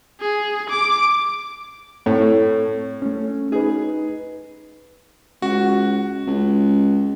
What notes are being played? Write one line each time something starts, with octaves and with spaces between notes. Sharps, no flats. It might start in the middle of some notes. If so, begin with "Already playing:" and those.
G#4
D6
A2 C4 A4 C#5
A3 C#4
D#4 G#4 B4
C#2 F#4
C#2